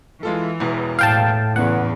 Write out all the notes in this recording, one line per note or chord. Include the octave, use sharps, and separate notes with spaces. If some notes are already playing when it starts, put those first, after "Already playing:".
E3 G#3 F4 A4
E1 E2
A2 F5 G5 A5
E2 C#3 E3 F#5